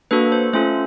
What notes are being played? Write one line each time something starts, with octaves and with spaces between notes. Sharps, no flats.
A#3 D4 F#4 A4 B4
C5
A3 C#4 F4 A4 C5